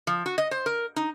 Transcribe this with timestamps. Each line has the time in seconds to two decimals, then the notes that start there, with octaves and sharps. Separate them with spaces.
0.07 F3
0.26 F#4
0.38 D#5
0.51 C5
0.66 A#4
0.96 D#4